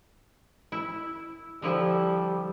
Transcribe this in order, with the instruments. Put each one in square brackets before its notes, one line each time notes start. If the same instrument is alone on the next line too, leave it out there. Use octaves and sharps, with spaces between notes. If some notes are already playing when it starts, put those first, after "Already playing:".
[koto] E4
[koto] D3 F3 E4 [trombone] G3